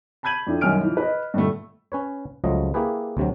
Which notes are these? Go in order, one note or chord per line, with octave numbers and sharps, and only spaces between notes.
A5 B5 G6 G#6 D#7 F#7
F2 D4 E4
C2 F#2 D#3 G#5 F6 D7
E3 F3
B4 D#5
G2 A#2 D3 A3
C#4 B4 C#5
C#2 F3 F#3 A3 D#5
A#3 E4 G4 G#4 B4
D2 C3 F#3